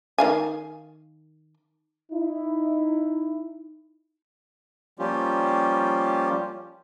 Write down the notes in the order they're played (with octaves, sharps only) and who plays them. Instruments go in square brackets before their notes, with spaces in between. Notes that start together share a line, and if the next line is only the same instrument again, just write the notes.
[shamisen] D#3 F5 G#5
[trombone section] D#4 E4
[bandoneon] F3 G3 A#3 C#4 F4 G4